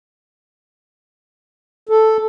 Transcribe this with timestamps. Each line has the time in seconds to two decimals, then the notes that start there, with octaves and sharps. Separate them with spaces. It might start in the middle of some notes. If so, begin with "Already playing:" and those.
1.89 A4